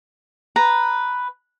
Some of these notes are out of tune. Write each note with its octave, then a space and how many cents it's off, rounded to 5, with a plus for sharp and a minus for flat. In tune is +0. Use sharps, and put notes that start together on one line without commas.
B4 +0 A#5 +0